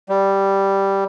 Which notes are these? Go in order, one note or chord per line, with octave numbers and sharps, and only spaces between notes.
G3